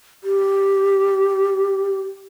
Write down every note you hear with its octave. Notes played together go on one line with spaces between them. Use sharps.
G4